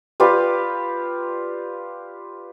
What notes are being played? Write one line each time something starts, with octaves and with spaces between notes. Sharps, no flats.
F4 G4 B4 D5